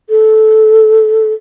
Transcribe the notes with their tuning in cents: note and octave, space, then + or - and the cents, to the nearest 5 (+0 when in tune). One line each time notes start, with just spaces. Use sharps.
A4 -10